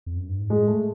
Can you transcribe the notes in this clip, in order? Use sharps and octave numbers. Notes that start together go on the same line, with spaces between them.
F2
F#2
G2
G#2
A2 G#3
A3